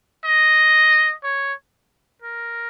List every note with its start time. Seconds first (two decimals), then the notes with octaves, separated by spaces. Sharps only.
0.25 D#5
1.24 C#5
2.22 A#4